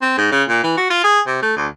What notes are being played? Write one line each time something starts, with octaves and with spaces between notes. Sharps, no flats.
C4
G#2
C#3
A#2
E3
F#4
F4
G#4
C3
A3
D2